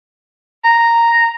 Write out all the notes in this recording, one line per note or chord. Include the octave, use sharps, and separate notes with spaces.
A#5